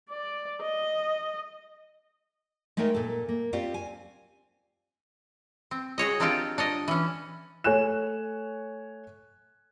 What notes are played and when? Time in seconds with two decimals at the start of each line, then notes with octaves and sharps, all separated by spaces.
0.10 D5
0.63 D#5
2.77 G#3 A3 D#4 A#4 C#5 G5
2.95 A#2 A4
3.29 A#3
3.53 C4 C#4 F4 G4 D5
3.74 G#5
5.71 C4
5.98 F#4 G#4 C#5 D#5
6.20 D#3 C4 D4 D#4 F4 G4
6.58 D4 C#5 D#5
6.88 E3 C#4
7.64 A3 C#5 G#5 F#6 E7